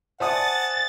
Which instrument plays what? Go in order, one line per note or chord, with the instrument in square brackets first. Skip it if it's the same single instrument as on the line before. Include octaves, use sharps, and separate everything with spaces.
[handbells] C5 D5 G#5 [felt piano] E5 A5 D#6 [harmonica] F#5 [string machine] A6